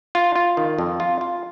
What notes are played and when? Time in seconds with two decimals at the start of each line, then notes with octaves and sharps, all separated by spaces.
0.15 F4
0.36 F4
0.57 D#3
0.78 F2
1.00 F4
1.21 F4